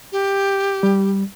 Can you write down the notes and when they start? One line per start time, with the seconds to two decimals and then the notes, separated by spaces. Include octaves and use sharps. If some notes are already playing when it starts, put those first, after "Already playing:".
0.12 G4
0.83 G3